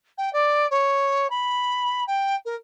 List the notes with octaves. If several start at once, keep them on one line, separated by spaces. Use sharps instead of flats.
G5
D5
C#5
B5
G5
A#4